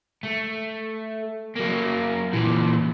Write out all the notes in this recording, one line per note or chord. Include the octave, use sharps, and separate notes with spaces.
A3
F#3 A#3
A#2 E3